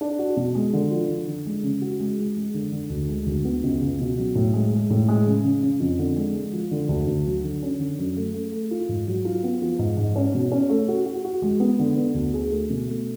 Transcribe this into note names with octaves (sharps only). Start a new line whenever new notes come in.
D4
F#4
B2
G#3
D3
F3
D3
D3
G#3
C#3
F#4
G#3
G#3
G#3
D3
D3
D2
G#3
D2
B3
C#2
C#2
B2
F#3
A2
G#3
G#3
A2
G#3
C#3
C#3
C#3
F2
D3
G#3
G#3
F3
D3
D2
D2
F#3
D3
C#4
D3
F#2
A3
A3
A3
F4
G#2
F#3
F4
B3
F3
G#2
G#2
C#4
B2
C#4
A3
F#4
F#4
F#4
G#3
B3
D3
B3
D2
G#4
A3
B2
A3